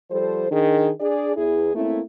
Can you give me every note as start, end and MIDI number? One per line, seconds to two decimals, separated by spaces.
0.11 0.46 53
0.11 0.46 55
0.11 0.46 69
0.11 0.46 72
0.51 0.90 51
0.51 0.90 62
0.51 0.90 68
1.00 1.32 62
1.00 1.32 68
1.00 1.32 74
1.36 1.73 40
1.36 1.73 64
1.36 1.73 68
1.75 2.01 57
1.75 2.01 58
1.75 2.01 60
1.75 2.01 61
1.75 2.01 64